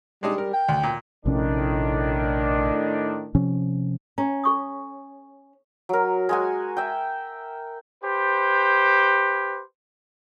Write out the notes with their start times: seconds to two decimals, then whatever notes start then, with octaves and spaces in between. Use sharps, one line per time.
0.23 G3 G#3 D4 D#4
0.38 A#4
0.53 G5
0.69 D2
0.83 A#2
1.25 A#1 A2 C3 D#3 C#4 D4
3.35 C3 F3 C#4
4.18 C#4 A#5
4.44 A4 C#6 D#6
5.89 F#3 A#4
6.29 G#3 F#4 G#5
6.77 E5 G5
8.04 G4 B4 C5